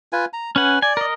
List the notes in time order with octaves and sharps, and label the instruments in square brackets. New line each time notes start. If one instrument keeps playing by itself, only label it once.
[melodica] F4 B4 G#5
A#5
[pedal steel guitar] C#4 F#5 [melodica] B4 G#5
[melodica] D5 [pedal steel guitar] G#5
[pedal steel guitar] A#4 D#5